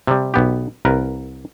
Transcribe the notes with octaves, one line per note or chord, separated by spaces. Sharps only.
C3 G3
B1 B3 G4
C2 A#4 B4